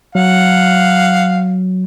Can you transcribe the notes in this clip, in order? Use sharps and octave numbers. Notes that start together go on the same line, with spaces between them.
F#3 F5 F#5